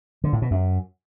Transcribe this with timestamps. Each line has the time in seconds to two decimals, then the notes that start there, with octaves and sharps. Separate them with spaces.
0.24 D3
0.33 A2
0.42 B2
0.51 F#2